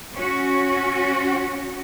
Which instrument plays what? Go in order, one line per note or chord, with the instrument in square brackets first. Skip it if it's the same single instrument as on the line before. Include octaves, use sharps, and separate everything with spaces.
[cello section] C#4 F#4